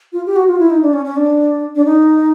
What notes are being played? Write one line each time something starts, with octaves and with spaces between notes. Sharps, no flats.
F4
G4
F#4
F4
E4
D#4
D4
C#4
C#4
D4
D4
D#4